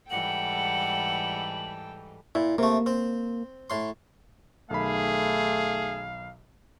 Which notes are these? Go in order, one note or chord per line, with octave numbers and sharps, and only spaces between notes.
G#2 E3 G3 A4 F#5 G5 F#7
A#2 E4
C3 A3 A#3
C4
A2 C6
B1 D#3 A3 G#4 F5 B5